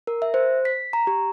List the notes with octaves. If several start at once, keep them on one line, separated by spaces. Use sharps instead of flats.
A#4
E5
C5
B6
A#5
G4